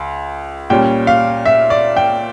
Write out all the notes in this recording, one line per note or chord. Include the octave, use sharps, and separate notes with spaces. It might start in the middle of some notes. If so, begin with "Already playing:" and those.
Already playing: C#2
A#2 G3 C#4 G5
F5
E5
D5
G5